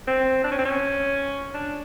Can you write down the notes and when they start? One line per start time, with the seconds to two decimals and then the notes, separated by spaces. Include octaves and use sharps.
0.07 C4
0.44 D4
0.51 C#4
0.58 C4
0.65 C#4
1.54 D4